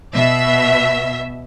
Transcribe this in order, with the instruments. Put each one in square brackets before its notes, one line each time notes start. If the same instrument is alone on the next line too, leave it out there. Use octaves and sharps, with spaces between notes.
[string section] B2 E5